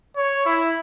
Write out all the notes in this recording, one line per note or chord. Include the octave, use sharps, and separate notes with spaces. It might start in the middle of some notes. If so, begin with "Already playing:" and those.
C#5
E4